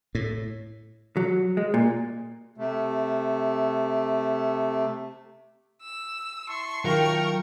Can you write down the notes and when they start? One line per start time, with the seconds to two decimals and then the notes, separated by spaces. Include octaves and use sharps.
0.15 A2
1.17 F#3
1.57 G#3
1.74 A#2
2.58 C3 A3
5.82 E6
6.49 E4 A5 C6 C#6
6.86 D#3 F#3 F4 A#4 G5